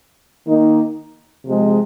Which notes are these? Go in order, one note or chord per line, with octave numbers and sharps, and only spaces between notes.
D#3 A#3 D#4
C3 F3 G#3